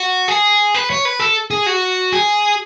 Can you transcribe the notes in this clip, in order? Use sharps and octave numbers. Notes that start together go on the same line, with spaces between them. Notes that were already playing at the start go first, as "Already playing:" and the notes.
Already playing: F#4
G#4
B4
C#5
B4
A4
G#4
F#4
G#4